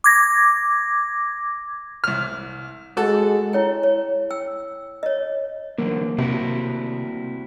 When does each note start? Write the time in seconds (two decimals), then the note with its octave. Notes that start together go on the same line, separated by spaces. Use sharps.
0.04 D6 G#6 A#6
2.04 C2 F6
2.97 G#3 F#4 A4
3.53 E4 C#5 G5
3.83 C#5
4.31 G5 E6
5.03 C#5 D#5
5.78 D3 E3 F#3 A#3
6.18 C3 C4 E4 F#4